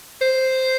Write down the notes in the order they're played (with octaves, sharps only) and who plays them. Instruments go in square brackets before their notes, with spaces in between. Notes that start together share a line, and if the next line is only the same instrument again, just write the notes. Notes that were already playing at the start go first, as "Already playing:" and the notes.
[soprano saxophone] C5